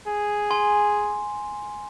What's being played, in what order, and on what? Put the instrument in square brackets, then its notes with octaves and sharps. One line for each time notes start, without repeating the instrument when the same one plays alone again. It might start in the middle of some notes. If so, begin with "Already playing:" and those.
[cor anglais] G#4
[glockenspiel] G#5 C6